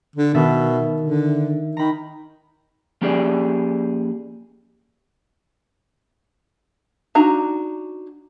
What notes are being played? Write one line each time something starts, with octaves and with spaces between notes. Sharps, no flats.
D3
B2 D#3 E5 A6
D3
D#3 A#5 B5
F3 A#3 C#4 G4 G#4 D5
D4 D#4 F#4 A#5